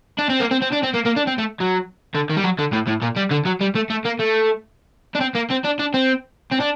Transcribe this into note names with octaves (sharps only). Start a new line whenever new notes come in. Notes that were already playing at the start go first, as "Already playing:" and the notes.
D4
C4
A#3
C4
C4
D4
C4
A#3
A#3
D4
C4
A3
F#3
D3
D#3
G3
F#3
D3
A2
A2
A#2
G3
D3
F#3
G3
A3
A3
A#3
A3
D4
C4
A#3
C4
D4
D4
C4
C4
D4